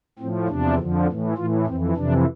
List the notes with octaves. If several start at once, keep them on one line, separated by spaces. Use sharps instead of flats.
A2 F3 C4
E2 C3 F3 D4
F2 D3 F3
A2
E3
A2 E3 F4
F2 E3 C4
F2 C3 E3 D4